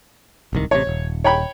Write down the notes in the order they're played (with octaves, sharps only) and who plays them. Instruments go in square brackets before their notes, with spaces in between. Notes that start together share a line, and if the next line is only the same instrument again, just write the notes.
[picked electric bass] D1 C2 D#3
[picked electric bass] A1 C3 [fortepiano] C#5
[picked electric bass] D#1
[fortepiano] C#5 G5 B5